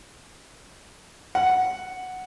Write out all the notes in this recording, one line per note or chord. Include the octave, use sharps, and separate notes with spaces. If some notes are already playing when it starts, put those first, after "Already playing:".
F#5